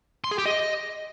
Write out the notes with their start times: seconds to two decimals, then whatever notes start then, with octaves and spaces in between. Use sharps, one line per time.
0.24 C6
0.31 G#4
0.38 G4
0.46 D#5